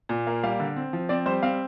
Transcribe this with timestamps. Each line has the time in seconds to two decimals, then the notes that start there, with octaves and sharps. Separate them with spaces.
0.09 A#2
0.27 A#3
0.44 G3 F5
0.60 D3
0.76 C4
0.93 F3
1.09 C4 D5
1.26 G3 C5
1.43 C4 F5